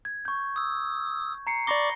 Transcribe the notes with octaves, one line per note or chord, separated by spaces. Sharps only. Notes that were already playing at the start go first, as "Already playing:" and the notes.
G#6
C#6 G6
D#6 E6
A#5 C7 C#7
D5 B5 C#6 D6 A#6 G7